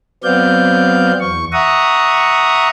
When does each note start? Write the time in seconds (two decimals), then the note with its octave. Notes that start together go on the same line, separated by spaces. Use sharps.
0.24 F#3 B3 C4 D5 F5 G6
1.21 E2 C#6
1.53 E5 F#5 A#5 C#6 D#6